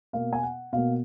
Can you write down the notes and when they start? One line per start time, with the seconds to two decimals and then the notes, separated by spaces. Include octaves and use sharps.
0.13 B2 A#3 F5
0.33 G#5
0.43 F#5
0.73 B2 A#3 F5